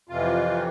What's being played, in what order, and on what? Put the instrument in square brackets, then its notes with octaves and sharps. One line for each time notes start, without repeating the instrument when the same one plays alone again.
[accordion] F2 C3 E3 F4